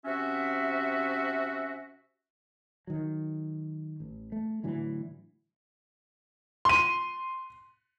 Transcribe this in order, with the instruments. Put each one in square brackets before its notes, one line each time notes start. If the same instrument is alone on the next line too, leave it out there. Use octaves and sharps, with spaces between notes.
[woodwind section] C3 C#4 F#4 E5
[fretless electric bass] D#3 F#3
A1
A3
A2 D3 E3 F#3
[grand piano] C6 D#7